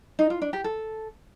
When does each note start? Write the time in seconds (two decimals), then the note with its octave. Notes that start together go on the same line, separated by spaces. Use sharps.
0.19 D#4
0.30 F4
0.42 D4
0.53 G4
0.64 A4